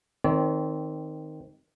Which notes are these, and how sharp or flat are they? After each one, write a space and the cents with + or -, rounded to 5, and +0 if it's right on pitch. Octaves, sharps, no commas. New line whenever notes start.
D#3 +0 C4 +0 C#5 +45